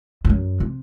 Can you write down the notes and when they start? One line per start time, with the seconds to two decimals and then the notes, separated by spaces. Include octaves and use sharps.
0.25 F2
0.29 F#2
0.60 C3